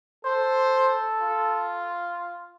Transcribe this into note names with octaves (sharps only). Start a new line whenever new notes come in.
A4 C5
F4